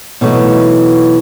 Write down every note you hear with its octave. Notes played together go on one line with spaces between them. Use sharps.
B2 E3 F#3 A3 D#4